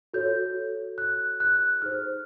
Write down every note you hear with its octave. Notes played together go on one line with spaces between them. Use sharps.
F#4 A4 C#5 G6
F#6
F#6
D#4 G#4 C5 F6